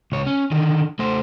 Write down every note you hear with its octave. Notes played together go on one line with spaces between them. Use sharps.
C#2 C#5
C#4
D3 D#3
A3 C5